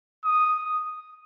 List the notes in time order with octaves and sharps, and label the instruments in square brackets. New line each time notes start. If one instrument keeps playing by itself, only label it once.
[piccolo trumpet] D#6